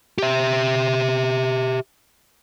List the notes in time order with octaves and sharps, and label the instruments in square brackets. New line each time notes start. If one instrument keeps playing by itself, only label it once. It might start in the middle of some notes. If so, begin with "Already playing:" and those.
[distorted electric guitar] G4 E5